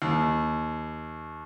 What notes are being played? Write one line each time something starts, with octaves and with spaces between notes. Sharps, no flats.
D#2